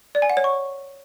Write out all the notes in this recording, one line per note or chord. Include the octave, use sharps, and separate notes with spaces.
D5
G#5
F#5
C#5
C#6